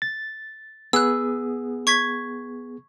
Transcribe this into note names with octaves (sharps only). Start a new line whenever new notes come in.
A6
B3 G#4 E6 F#6
C#6 G#6 B6